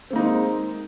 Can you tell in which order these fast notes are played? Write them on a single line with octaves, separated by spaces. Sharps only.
C4 A#3 D#4 G#3